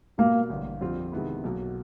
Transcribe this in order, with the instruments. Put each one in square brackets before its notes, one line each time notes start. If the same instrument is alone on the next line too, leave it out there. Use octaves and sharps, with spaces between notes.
[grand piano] B2 G3 B3 [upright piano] A#3
[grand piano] A1 G2 D3
F2 D3 G3 C4 F4
C3 D#3 G#3 B3 E4
B1 B2 F#3 A#3